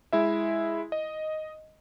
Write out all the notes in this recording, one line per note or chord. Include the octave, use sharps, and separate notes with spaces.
G#3 E4 E5
D#5